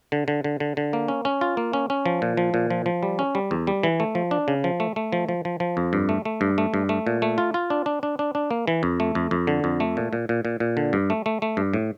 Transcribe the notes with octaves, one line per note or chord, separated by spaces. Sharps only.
D3
D3
D3
D3
D3
A#3
C#4
C#4
F4
A#3
C#4
C#4
F3
A#2
F3
A#2
F3
F3
G3
C#4
G3
E2
G3
E3
A3
F3
D4
C#3
F3
A3
A3
F3
F3
F3
F3
F2
G2
A3
A3
G2
A3
G2
A3
A#2
A3
F4
F4
D4
D4
D4
D4
D4
A#3
E3
F2
A3
F2
F2
D3
F2
A3
A#2
A#2
A#2
A#2
A#2
D3
G2
A3
A3
A3
G2
A2